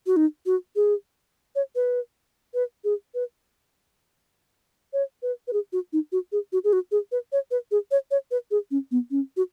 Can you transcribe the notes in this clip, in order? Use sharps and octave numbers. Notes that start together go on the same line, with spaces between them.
F#4
D#4
F#4
G#4
C#5
B4
B4
G#4
B4
C#5
B4
B4
G#4
F#4
D#4
F#4
G#4
F#4
G#4
F#4
G#4
B4
C#5
B4
G#4
C#5
C#5
B4
G#4
C#4
B3
C#4
F#4